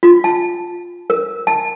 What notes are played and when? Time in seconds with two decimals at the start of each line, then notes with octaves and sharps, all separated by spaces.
0.03 F4
0.24 A5
1.10 A#4
1.47 A5